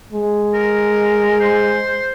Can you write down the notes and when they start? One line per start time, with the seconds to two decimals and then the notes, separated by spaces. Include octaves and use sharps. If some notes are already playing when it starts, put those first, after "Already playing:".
0.12 G#3
0.54 A#4
1.40 C5